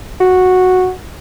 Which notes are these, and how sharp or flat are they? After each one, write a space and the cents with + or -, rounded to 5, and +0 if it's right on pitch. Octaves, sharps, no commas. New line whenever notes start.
F#4 -5